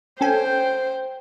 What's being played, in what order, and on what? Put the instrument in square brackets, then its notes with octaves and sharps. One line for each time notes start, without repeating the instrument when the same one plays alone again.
[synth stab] C#4 A4 G#5 [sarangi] C5 [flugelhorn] G5